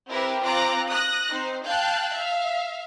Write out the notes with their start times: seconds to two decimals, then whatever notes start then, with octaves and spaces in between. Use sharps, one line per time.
0.11 C4 E4 G4 A#4 B4
0.43 C4 F4 A#5 D6 F#6
0.88 D#6 F#6 A#6
1.30 C4 D#4 C5
1.67 F5 G5 A5 F#6 G6
2.13 E5 F5